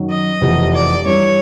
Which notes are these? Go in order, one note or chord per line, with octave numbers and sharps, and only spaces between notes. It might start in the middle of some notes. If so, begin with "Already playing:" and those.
Already playing: F#2 D#3 F#3
D#5
F1 E2 C3 F3
D5
G2 E3 G3 C#5